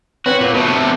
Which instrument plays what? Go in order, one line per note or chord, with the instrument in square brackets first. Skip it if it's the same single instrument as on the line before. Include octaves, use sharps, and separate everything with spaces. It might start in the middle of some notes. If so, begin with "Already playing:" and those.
[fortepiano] C4 B4 C#5 [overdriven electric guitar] F#4
[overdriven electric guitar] A#2
[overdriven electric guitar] B2 A3 [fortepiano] B3 C#6
[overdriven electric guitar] C3 A3